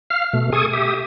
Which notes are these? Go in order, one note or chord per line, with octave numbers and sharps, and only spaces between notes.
F5 F6
B2 A3
G#4 A4 G#5 C#6 D#6
G4 E5 D#6